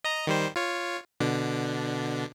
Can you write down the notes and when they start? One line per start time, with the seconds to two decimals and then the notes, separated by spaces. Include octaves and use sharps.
0.04 D#5 A#5
0.27 D#3 G3 C5
0.56 F4 C#5
1.20 B2 D3 D4